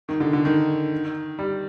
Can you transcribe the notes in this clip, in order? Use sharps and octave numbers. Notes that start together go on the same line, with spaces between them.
D#3
D3
D3
D#3
G3